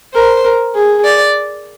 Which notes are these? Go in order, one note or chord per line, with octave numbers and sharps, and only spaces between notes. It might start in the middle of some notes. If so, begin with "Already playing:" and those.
A#4 C5
A#4
G#4
D5